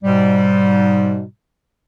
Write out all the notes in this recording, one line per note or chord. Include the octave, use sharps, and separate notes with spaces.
G#2 B2 G3